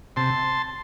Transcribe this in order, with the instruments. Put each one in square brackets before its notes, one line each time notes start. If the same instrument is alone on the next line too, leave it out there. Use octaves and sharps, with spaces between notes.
[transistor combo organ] C3 A5 C6